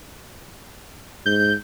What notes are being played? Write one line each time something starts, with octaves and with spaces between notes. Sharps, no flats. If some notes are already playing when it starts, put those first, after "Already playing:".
G#2 G6